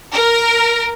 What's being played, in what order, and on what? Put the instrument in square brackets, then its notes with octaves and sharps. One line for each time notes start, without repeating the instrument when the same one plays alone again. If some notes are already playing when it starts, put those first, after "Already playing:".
[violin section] A#4